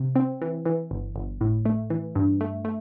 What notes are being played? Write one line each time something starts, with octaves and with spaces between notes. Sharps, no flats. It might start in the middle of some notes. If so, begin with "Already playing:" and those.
Already playing: C3
C4
E3
E3
G1
G1
A2
A3
E3
G2
A3
A3